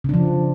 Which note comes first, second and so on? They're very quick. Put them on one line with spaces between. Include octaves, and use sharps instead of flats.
C#3 D4 F3